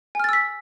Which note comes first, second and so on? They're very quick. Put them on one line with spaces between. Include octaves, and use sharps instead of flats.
G#5 F6 A6 E6 B6